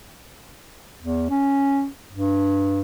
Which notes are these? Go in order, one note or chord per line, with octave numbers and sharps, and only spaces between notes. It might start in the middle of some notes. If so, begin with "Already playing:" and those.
E2
C#4
G2